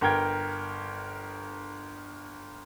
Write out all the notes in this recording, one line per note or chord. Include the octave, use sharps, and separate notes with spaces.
G1 A#4 G5 G#6